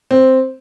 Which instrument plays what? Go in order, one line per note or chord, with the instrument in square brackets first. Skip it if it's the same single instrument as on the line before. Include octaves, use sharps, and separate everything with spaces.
[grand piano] C4